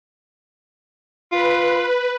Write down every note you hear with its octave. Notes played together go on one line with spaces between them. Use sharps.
F4 B4